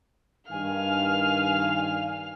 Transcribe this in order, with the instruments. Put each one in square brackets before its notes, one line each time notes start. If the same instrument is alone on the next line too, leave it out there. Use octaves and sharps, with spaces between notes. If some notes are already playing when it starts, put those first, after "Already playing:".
[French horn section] G2 D#3 [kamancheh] F5 F6 [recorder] G#5